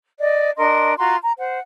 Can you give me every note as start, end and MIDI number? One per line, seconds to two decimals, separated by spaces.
0.21 0.51 74
0.21 0.51 75
0.57 0.93 62
0.57 0.93 70
0.57 0.93 75
0.57 0.93 84
0.98 1.16 65
0.98 1.16 66
0.98 1.16 82
0.98 1.16 84
1.23 1.33 82
1.39 1.60 72
1.39 1.60 78